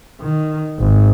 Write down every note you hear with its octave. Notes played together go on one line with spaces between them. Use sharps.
D#3
G#1